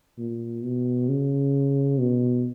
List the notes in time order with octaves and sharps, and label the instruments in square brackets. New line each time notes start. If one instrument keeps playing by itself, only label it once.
[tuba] A#2
B2
C#3
B2